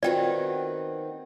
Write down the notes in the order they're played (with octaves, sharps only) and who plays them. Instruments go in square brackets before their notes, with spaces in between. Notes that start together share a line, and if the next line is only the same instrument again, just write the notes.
[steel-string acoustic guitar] D#3 B3 C4 [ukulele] F4 F#4 [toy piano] D5 G5